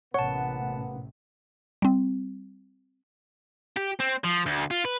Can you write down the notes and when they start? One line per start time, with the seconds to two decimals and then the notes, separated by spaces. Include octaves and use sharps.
0.14 A1 C3 A#3 B3 C#5 F#5 A5
1.82 G3 C4
3.77 G4
4.00 C4
4.24 F3
4.46 D2
4.71 F4
4.85 B4